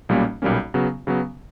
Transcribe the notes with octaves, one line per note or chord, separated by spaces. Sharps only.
B1 A#2 G3 A#3 C#4
B1 A#2 G3 A#3 C#4
C#3 F#3 B3
C#3 F#3 B3